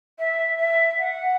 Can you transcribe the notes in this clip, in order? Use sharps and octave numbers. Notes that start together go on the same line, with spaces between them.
E5
E5
F#5